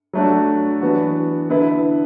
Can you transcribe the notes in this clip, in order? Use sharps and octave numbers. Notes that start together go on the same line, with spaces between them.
F#3 A3 D4 F#4
E3 B3 D4 F#4
D3 B3 E4 B4